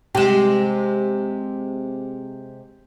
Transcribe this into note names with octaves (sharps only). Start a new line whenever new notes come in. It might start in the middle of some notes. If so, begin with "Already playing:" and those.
C3 G#3 G4 E7